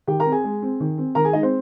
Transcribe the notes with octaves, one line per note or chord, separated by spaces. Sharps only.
D#3 G4 G5
A#4 A#5
C4
G#4 G#5
G#3
C4
D#3
C4
D#3 A#4 A#5
G#4 G#5
G#3 D#4 D#5
C4 C5